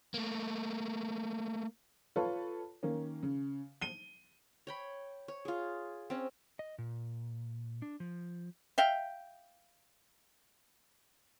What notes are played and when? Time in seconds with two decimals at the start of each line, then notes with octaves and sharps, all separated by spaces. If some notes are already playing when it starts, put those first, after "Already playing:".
0.14 A3 A#3
2.16 F4 A4 B4 C#5
2.83 D#3 A#3 C#4
3.23 C#3
3.82 D#7 G7
4.67 C#5 G5 B5
5.28 C#5
5.45 F4 G#4
6.10 C4 C#4
6.59 D#5
6.78 A#2
7.82 D4
8.00 F3
8.78 E5 F5 G5